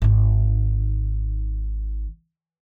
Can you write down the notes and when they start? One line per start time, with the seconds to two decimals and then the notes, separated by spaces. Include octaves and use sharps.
0.02 G#1 D#3